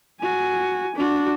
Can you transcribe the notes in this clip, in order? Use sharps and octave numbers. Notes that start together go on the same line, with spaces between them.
F#4 G#5
D4 F#4